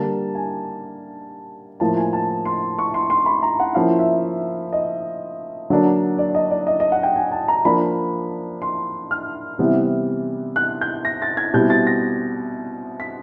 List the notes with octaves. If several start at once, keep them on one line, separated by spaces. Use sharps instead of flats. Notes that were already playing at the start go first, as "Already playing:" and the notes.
Already playing: D3 G3 A#3 A5
G#5
A2 F3 A#3 A5
G#5
A5
C6
C#6
C6
C6
B5
A#5
F#5
F3 A#3 C#4 E4 F5
E5
D#5
D3 F#3 A#3 D4
D5
D#5
D5
D#5
D#5
F#5
G5
G#5
A5
A#5
F3 A#3 D4 B5
C6
F6
C3 E3 G3 B3
F#6
G6
A#6
A6
G#6
B2 G3 C4 E4 G6
A6
A#6
B6